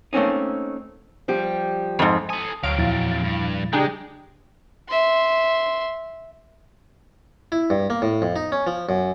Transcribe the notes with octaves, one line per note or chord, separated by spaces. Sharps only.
A3 A#3 C4 C#4 D#4
F3 G3 G4
F2 G#2
A4 G#5 A5 D#6
D2 F#3 C4 F5 D7
E2 A#2 F3 E4 A6
G2
C#3 G#3 D4 G4 G#4 G5 A#5
E5 C6
E4
G2
A#3
A2
F2
D#4
C#4
F3
F#2